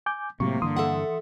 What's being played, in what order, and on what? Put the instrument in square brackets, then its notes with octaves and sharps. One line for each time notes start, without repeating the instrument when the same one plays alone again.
[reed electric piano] G#5 D6 G6
[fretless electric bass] A2 C3 [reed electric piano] F#3 G#3 C#6 [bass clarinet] A#3
[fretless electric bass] G2 D3 [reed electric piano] E3 C6 D#6
[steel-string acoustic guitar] A4 E5 F#5